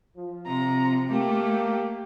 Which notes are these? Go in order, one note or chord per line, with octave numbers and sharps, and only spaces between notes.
F3
C3 A#5
A3 A#3 G4